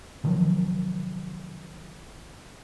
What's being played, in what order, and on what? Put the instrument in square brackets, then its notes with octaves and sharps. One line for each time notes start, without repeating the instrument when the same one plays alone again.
[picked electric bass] C3 D#3 F3 F#3